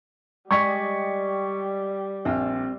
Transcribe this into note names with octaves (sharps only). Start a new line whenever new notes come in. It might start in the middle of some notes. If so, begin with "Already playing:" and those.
G3 G#3 D5 D#5 G5 C#6 G#6 B6
A#1 C4 F4